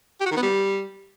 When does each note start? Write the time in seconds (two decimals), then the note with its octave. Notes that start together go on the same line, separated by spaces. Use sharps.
0.20 G4
0.26 F#4
0.31 D#3
0.37 B3
0.42 G3